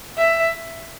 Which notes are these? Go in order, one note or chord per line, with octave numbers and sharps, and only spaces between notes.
E5